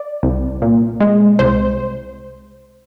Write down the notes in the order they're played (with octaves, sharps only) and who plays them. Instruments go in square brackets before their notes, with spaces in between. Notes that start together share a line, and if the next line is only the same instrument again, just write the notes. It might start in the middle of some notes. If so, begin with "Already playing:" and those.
Already playing: [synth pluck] D5
C2
A#2
G#3
C2 C5